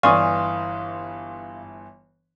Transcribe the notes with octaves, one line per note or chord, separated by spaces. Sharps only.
G1 E3 D5 F5 G#5 C6 C#6 D#6